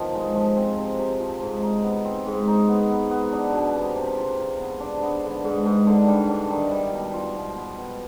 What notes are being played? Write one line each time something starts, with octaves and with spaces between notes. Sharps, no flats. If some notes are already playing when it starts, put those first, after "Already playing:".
Already playing: C3 D#3 F3 B3
G#3
F3
C4
C3
C3
F3
G#2
D#4
B3
C4
G#2
D#4
B3
B3
B3
D4
B2
C3
C3
F4
F4
B3
D4
B3
D3
G#2
G#2
D3
G3
D4
D#3
G3
B2
F4
B2
B3
B3